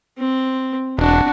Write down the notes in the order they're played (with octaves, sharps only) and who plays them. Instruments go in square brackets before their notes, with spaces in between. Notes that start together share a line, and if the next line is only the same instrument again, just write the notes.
[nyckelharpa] C4
[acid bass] E1 [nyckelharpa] D4 F#4